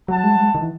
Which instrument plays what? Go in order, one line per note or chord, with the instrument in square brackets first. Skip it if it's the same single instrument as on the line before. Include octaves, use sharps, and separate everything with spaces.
[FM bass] F#3 [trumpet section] F#5 A5
[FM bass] G#3
F#3
G#3
D#3
E3